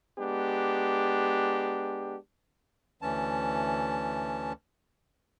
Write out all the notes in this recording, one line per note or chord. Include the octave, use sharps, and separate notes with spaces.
G#3 B3 D4 G4
D2 E3 C#4 A5